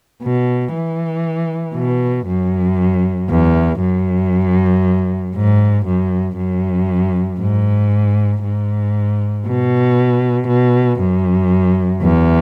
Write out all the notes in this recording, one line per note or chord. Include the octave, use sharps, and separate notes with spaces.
B2
E3
B2
F#2
E2
F#2
G#2
F#2
F#2
G#2
G#2
B2
B2
F#2
E2